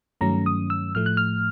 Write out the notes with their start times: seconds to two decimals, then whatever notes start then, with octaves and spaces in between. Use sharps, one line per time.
0.21 G2 D#3 F#3 A3 C#4 A#5
0.46 D#6
0.70 E6
0.95 A2 F3 A3 F6
1.06 F#6
1.17 F6